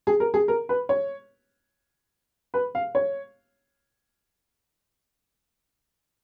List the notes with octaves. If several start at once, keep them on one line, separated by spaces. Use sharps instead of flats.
G#4
A#4
G#4
A#4
B4
C#5
B4
F5
C#5